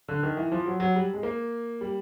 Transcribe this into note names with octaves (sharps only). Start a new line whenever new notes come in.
D3
D#3
E3
F3
F#3
F#3
G3
G#3
A#3
G3